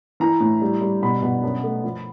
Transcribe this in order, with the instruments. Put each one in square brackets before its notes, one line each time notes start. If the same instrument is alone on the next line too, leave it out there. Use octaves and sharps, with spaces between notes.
[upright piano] E3 A#5
A2
G3
G3
B2 B5
B2
F#2
A3
F3